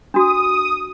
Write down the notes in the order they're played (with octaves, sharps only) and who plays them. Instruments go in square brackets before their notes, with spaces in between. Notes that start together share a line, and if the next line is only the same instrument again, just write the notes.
[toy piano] D4 F#4 [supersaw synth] D#6